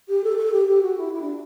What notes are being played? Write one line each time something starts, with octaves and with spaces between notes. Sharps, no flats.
G4
A4
A4
G4
G4
F#4
E4
E4
D4